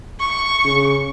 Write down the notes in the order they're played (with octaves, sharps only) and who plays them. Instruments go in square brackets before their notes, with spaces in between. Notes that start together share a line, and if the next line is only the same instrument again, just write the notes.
[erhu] C#6
[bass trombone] C#3